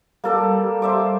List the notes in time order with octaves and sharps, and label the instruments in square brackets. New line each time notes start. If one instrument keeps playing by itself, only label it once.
[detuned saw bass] G3 [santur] A#3 A4 D5
[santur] C5 E5 D6